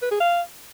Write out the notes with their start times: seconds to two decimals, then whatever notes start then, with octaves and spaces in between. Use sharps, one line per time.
0.02 B4
0.11 G#4
0.20 F5